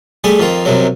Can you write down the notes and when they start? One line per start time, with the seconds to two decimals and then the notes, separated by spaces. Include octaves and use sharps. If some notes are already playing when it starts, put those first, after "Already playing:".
0.24 G3 A3 G#4 B5
0.39 F2 D#3 F4
0.65 C2 F#2 C3 F#3